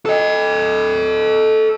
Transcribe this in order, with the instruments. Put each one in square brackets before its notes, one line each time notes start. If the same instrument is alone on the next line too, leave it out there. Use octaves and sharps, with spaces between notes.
[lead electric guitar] A4 D#5